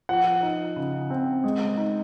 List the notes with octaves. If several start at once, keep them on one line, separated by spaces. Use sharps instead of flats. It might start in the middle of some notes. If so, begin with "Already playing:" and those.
F3 F#5
D#4
C#3
C4
G#3
D#4